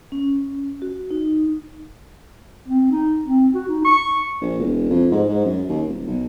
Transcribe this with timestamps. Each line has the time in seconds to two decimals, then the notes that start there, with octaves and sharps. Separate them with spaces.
0.12 C#4
0.82 F#4
1.11 D#4
2.68 C4
2.91 D#4
3.25 C4
3.55 F#4
3.68 D#4
3.85 C#6
4.41 A#1
4.59 E1
4.89 F2
5.11 G#2
5.28 G#2
5.45 F#2
5.69 D#2
5.88 D#1
6.06 B1